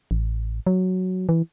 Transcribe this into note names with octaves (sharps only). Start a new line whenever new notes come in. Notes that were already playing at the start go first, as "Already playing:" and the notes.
A1
F#3
E3